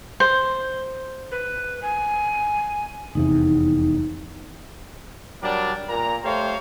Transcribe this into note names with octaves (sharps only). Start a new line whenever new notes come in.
C5
B4
G#5
F1 E2 C3 D#4
F#3 G3 D4 A#4 D5
A#2 A#3 A#5
A3 G4 C5 C#5 F5